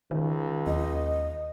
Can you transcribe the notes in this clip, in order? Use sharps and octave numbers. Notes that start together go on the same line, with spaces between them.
C#2 D#3
D#2 D#5